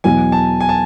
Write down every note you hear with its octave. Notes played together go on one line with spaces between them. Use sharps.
E2 B2 F#3 G#5
A5
G#5
A5